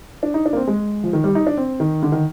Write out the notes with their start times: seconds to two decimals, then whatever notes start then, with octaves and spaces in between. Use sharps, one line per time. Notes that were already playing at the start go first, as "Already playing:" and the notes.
0.23 D4
0.34 D#4
0.46 D4
0.53 A#3
0.56 C4
0.68 G#3
1.04 F3
1.13 D#3
1.24 G3
1.35 D#4
1.47 D4
1.57 C4
1.80 D#3
2.03 D3
2.12 D#3